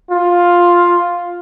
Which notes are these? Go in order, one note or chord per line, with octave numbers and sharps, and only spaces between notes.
F4